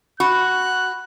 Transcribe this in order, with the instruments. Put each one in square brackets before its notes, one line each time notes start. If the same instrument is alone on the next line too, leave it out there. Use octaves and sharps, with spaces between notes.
[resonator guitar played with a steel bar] F#4 [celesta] B5 [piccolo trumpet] F#6